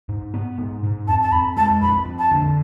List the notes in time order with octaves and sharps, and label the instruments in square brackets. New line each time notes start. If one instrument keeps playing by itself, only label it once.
[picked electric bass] G#2
B3
G#2
G#2
[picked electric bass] F2 [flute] A5
[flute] A5
[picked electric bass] F2 [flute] B5
[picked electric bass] G#3 [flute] A5
[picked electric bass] F2 [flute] B5
[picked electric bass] F2
[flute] A5
[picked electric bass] D3